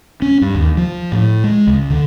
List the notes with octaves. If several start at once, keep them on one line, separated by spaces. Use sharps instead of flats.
C#4
G2
D#2
F3
A2
G#3
C#2
D3